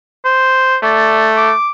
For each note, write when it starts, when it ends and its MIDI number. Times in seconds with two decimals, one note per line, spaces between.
0.25 0.77 72
0.83 1.53 57
0.83 1.30 74
1.37 1.71 86